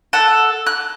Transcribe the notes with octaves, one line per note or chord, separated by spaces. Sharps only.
A4 F#5
F#6